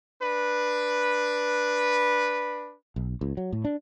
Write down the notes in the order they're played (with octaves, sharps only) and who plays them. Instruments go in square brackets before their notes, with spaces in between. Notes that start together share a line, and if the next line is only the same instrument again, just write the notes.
[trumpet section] D4 B4
[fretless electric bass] B1
C#2
F#3
A2
D4